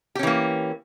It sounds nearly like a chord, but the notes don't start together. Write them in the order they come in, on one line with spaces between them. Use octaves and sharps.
G4 C#4 E3 A#3